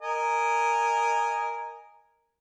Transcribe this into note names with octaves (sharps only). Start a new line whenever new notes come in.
A#4 D#5 G#5